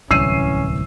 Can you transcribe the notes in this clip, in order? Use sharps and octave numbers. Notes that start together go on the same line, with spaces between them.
D1 C2 E3 C#4 E6 C7 D#7